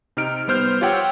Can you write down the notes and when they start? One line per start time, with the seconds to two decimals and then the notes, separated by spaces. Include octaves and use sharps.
0.17 C3 D#4 F6 D7
0.48 G3 B3 C5 F6 G6
0.81 F4 G4 C#5 F#5 G5 E6